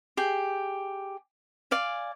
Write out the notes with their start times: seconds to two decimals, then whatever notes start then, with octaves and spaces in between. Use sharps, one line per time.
0.17 G4 G#4
1.71 D5 F5 G#5